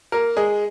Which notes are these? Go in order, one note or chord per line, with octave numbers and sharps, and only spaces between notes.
A#3 A#4
G#3 G#4